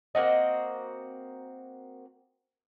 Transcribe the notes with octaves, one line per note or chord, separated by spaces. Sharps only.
A#3 C4 F#4 D#5